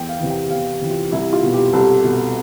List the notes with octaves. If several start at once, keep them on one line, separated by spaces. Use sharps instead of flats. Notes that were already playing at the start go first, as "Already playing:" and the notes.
Already playing: E2 G5
F5
C3 E3
G5
E2 F5
G4
C3 E3
F4
C2 E4
F4
B2
G4
C2 A4
B2